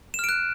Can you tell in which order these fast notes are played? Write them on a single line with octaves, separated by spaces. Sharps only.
E7 F6 D7 F#6